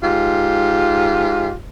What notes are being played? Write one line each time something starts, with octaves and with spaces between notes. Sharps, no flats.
G#2 F4 G4